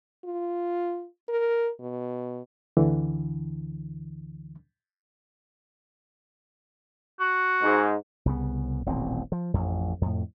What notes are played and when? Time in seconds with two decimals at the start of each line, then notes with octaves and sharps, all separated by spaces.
0.25 F4
1.29 A#4
1.80 B2
2.77 D2 D3 E3
7.20 F#4
7.62 G#2
8.26 C2 C#3 B3
8.86 D#1 A1 B2 C4
9.32 F3
9.54 A1 F2
10.01 F2 A2